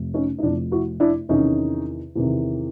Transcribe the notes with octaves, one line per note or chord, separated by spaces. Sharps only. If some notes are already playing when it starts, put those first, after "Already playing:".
Already playing: F1 F2 C3
C#4 D#4
D#4
F1 F2 C3 D4 E4
E4 F#4
D4 E4
E2 C3 D#3 C#4 D#4
E2 C3 D#3